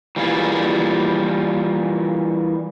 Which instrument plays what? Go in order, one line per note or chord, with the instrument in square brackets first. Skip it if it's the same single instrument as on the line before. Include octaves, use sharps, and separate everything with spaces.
[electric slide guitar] E3 G3 A#3 F4 G#4